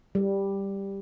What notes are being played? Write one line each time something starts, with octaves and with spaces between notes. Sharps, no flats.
G3